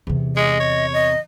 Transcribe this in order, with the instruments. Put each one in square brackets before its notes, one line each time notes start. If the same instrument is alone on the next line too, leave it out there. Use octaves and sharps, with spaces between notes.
[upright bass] E2 C3
[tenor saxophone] G#3 [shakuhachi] D#5
[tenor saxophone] C#5
[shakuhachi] D#5